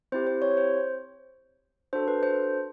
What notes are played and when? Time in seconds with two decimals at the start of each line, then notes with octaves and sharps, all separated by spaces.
0.12 C4 E4 G4 C5
0.27 C5
0.42 C#5
0.57 C5
1.93 D4 F#4 A4 C5
2.08 B4
2.23 C5